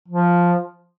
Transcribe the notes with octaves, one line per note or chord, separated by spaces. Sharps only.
F3